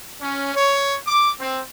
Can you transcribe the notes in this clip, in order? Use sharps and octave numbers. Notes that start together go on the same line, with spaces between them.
C#4
C#5
D6
C4